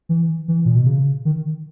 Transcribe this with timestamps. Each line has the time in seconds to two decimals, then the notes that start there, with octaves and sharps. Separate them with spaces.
0.09 E3
0.48 E3
0.65 A#2
0.76 B2
0.87 C#3
1.25 D#3